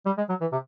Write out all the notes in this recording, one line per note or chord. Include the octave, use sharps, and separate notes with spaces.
G3
G#3
F#3
E3
C3